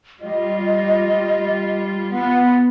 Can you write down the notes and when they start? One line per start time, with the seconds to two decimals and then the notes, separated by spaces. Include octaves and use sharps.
0.21 G3 F4 D#5
2.13 B3 F4 F#5